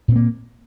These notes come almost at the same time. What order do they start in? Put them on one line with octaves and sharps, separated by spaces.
A#2 C4 A#3